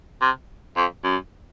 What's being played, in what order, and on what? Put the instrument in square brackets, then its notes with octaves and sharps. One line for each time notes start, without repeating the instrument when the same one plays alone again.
[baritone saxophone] C3
F2
F#2